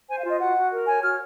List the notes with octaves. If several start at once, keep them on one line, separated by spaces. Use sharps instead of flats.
C5 G#5
F5
F4 D#5
F#4 F#5
F#4
A#4
C#5 G#5
F#4 F6